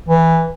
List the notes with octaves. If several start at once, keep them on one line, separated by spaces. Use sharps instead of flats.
E3